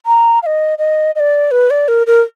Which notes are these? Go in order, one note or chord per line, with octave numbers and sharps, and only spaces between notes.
A#5
F5
D#5
D#5
D#5
D5
B4
D5
A#4
A#4